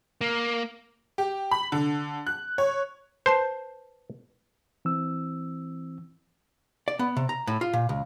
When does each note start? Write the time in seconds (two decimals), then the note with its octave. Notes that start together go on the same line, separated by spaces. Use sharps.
0.21 A#3
1.18 G4
1.51 B5
1.72 D3
2.27 F#6
2.58 C#5
3.26 B4 C5 A5 C7
4.85 E3 C4 E6
6.88 D5
6.99 B3
7.17 C3
7.29 A#5
7.47 A2
7.61 F4
7.73 A#2
7.89 C#2